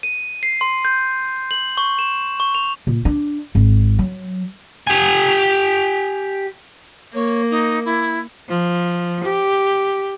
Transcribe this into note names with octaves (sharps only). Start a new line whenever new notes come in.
D#7
C7
C6
G6
F#7
C#6
E7
C#6
F7
A#2
D4
G#1
F#3
G4 G#5
A#3 C#5
D#4
E4
F3
G4